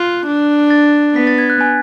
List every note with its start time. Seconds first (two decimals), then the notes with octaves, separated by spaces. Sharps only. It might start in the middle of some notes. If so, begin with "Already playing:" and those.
Already playing: F4 F#6
0.27 D4
0.70 A6
1.16 B3 B6
1.27 A6
1.38 G#6
1.50 F#6
1.61 G#5